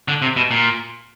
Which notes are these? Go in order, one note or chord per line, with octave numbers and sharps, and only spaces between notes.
D3
C3
B2
A#2